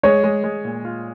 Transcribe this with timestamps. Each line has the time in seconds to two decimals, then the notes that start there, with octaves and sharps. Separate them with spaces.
0.03 G#3 C#5
0.23 G#3
0.44 G#3
0.65 A#2
0.85 F4